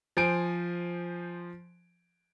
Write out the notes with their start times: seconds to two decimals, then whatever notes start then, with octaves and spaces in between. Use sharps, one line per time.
0.17 F3 C5 G#5 D7